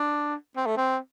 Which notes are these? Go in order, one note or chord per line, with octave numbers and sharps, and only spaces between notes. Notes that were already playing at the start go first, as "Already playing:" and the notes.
Already playing: D4
C4
A3
C4